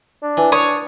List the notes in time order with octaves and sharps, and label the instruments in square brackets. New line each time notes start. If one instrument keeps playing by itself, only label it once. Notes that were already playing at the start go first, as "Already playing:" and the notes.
[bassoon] D4
[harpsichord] E3
[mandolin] C#5 [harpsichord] D#6